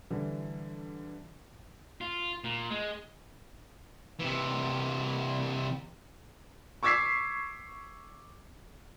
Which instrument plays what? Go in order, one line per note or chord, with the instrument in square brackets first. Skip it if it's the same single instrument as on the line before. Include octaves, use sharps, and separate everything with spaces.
[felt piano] D3 E3 G3
[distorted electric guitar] F4
A#2
G#3
C3 E3
[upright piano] C#6 D6 E6 G#6 B6 C7